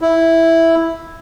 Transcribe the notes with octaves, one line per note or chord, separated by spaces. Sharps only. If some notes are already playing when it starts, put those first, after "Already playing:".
E4